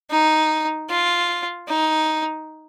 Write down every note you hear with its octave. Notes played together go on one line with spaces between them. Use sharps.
D#4
F4
D#4